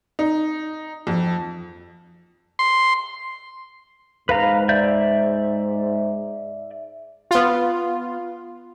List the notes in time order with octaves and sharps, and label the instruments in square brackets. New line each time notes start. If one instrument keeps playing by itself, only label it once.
[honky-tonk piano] D#4
F2
[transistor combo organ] C6
[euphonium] G#2 [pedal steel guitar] B4 F5 A#5
[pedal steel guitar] D5 E5 G6
[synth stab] B3 F4